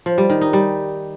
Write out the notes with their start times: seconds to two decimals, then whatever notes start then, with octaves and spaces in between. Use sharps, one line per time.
0.06 F3
0.18 G3
0.30 D#3
0.41 D#4
0.53 G3